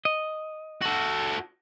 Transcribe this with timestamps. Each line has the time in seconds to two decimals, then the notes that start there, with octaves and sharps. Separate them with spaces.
0.05 D#5
0.82 F#4 A4